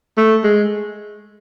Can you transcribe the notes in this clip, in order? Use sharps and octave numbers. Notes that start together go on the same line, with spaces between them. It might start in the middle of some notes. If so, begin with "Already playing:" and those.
A3
G#3